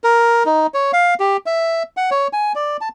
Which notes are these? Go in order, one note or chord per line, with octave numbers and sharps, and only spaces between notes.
A#4
D#4
C#5
F5
G4
E5
F#5
C#5
G#5
D5
A5